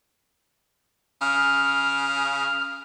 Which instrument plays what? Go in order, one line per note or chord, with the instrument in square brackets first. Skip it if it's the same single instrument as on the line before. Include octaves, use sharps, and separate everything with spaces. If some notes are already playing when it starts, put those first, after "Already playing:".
[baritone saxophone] C#3 [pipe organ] F6